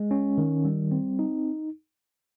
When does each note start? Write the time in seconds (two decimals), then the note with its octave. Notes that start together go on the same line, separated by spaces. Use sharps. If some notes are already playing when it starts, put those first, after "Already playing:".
Already playing: G#3
0.11 C#4
0.38 D#3
0.65 G3
0.91 C4
1.19 D#4